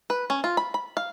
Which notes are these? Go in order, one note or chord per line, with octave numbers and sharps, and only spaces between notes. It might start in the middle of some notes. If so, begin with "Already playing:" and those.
B4
C#4
F4
B5
B5
F5